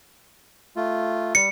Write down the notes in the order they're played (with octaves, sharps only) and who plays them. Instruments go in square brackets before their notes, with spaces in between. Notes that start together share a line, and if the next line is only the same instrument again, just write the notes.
[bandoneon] A3 F4
[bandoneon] G3 [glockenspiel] C#7